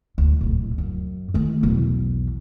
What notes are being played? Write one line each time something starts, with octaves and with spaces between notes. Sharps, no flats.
D2
D1 A#2
F#2
D#3 A3
B1 E2